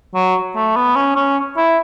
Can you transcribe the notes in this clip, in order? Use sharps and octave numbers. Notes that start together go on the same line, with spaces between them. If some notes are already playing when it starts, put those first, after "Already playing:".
F#3
A3
B3
C#4
C#4
E4